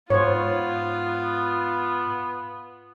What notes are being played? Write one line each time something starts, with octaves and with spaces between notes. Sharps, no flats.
G#2 B3 F4 C5 C#5